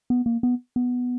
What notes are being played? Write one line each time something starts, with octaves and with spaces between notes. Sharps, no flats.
B3
A#3
B3
B3